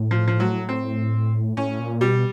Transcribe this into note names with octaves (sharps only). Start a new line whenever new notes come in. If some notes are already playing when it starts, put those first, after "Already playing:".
Already playing: A2
F3
F3
F#3
C4
A2 C#4
A#2
B2 G3